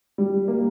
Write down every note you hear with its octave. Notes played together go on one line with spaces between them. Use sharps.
G3
A#3